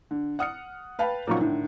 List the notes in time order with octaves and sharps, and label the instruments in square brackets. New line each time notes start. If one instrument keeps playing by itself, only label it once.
[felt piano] D3
F#5 D#6 F6 C#7
B4 F5 G5 A5 B5
A#2 C#3 F3 F#3 D#4 C#6
A2 D3 D#3